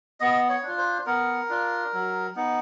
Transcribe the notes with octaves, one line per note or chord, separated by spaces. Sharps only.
B3 D#5
C#5
D4 F4
C5
B3 A#4
D4 F4
F#3
B3 D#4